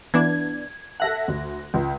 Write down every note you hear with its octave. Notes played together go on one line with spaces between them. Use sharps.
E3 B3 D4 G#6
A4 E5 F#5 F#6 A#6
D2
C#2